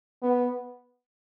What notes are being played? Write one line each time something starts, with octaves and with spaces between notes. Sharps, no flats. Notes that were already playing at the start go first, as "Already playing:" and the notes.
B3